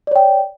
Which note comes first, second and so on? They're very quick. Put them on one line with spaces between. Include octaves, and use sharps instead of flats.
D5 C#5 G5